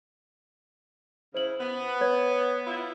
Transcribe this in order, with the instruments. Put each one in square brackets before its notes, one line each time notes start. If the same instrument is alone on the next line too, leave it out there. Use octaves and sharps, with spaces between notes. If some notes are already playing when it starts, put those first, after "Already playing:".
[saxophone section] C#3 E4 [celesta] C5 F#7
[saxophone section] B3
[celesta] B4 C#5 G#6
[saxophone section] E4 F4